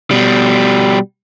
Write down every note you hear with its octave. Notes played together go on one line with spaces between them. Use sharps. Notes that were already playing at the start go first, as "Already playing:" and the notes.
B2 G3